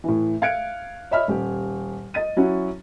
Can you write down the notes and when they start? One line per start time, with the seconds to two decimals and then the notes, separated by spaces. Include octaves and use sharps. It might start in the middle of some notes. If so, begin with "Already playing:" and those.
0.04 A2 E3
0.41 E5 F5 F#6 G#6 C#7 D7
1.11 C#5 D#5 E5 B5 F6
1.28 D#1 G4
2.14 D#5 A6 D#7
2.37 F#3 C#4 E4 F#4